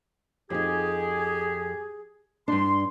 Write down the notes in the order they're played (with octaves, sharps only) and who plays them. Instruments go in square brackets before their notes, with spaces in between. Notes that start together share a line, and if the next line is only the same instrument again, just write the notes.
[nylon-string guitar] F2 D#4 [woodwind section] G4 G#4
[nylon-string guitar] G2 D4 [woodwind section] C6